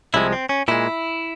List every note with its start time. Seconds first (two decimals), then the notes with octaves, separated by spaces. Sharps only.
0.14 C2 C3 F3 G#3 E4
0.33 C4
0.49 C#4
0.68 A#2 G#3 E4